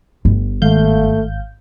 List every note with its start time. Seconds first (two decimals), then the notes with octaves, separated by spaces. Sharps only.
0.25 G1
0.62 G#1 A3 F5 G6